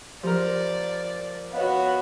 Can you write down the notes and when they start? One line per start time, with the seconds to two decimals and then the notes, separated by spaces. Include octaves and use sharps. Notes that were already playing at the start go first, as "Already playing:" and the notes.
0.23 F3 G4 A#4 D5
1.53 B3 F#4 C#5 D#5 F5